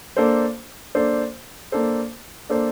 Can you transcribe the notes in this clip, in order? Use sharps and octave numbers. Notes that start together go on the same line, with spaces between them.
A#3 D4 A4 C5
A#3 D4 A4 C5
A#3 D4 A4 C5
A#3 D4 A4 C5